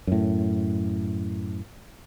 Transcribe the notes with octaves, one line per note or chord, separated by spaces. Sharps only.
F#2 A2